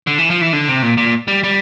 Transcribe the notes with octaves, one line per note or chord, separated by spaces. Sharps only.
D3
E3
F3
E3
D3
C3
A#2
A#2
G3
G3